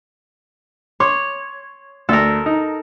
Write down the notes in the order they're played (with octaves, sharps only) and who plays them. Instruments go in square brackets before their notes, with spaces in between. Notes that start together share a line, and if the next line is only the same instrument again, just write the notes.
[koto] C#5 [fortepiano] C6 D6
[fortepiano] D2 [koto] A4 A#4
[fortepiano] D#4